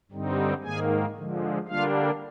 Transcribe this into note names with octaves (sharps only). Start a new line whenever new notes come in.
G2 D3 G3 C4 D#4
G#2 D#3 A#3 G#4 G#5
D3 F3 G#3
D3 G3 A#3 D4 F4 F5